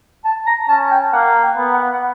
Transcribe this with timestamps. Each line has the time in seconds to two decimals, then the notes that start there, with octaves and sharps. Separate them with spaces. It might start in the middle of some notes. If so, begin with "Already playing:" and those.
0.25 A5
0.46 A#5
0.69 C#4 A5
0.91 G5
1.12 A#3 F#5
1.42 G5
1.57 B3
1.72 F#5
1.93 F#5